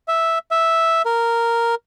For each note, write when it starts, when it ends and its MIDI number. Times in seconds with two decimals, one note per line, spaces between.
0.08 0.38 76
0.51 1.02 76
1.05 1.75 70